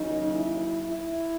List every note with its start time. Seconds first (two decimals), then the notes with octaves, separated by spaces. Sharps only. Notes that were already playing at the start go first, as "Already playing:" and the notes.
Already playing: D#2 C#3 F#3 D#4
0.32 E4
0.83 E4